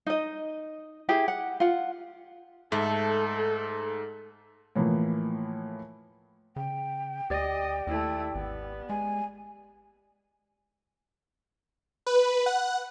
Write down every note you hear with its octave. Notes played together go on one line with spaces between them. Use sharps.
D#4 D#5
E4 G4 G#4 G5
F#5
F4 F#5
G#2 A3 A4
A2 E3 F3 A#3
C#3 G5
D2 G4 D5 D#5
D#2 A3 E4
G#1 B3
G#3 G#5
B4
F#5